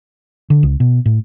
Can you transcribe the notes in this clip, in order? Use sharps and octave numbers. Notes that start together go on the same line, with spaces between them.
D3
C#2
B2
A2